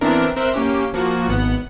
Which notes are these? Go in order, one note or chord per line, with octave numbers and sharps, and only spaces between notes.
E3 B3 C4 D4 E4 A#4
C4 A#4 C5 E5 F#6
A#3 C#4 G4
F3 A#3 F#4
G#1 B3 F#5